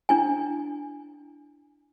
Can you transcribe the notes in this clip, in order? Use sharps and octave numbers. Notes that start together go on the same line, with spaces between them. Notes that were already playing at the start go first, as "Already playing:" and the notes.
D4 E4 G#5